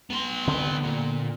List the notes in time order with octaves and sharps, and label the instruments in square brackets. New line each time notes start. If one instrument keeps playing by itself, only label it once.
[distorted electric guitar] B3 C6
[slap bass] D3 C4
[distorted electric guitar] A#2